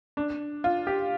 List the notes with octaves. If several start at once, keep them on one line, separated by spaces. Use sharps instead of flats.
D4
F4
G4